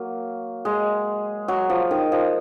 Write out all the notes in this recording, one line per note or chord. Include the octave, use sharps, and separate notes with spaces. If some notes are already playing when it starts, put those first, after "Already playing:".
Already playing: F#3 A#3
G#3
F#3
F3
D#3
F3